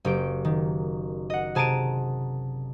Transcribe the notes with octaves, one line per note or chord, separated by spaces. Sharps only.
F#1 G4 D7
D#3
D#5 F#5
C3 G#4 A5 A#5 D7 D#7